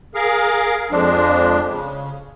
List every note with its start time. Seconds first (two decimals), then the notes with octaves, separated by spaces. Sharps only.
0.15 G#4 A#4 F5
0.91 F2 F3 G#3 D4
1.69 C#3